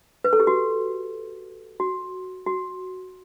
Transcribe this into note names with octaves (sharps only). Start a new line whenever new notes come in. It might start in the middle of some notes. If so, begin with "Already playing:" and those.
B4
A4
G4
F#4
F#4
F#4